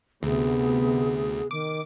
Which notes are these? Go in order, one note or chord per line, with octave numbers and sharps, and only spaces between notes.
D2 C3 B3 G#4
D#3 D6